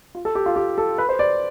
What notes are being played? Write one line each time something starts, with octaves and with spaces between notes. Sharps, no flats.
F4
A4
G4
F4
G4
A4
B4
C5
D5